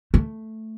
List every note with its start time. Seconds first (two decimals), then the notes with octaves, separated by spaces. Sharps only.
0.14 A3